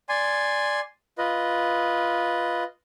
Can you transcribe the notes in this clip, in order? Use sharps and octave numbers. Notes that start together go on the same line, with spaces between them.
D5 G#5 C6
F4 B4 D#5